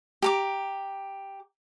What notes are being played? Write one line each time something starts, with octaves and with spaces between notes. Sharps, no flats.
G4 A#5 D6